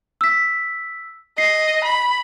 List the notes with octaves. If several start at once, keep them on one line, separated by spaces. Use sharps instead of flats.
E6 B6
D#5 C7
B5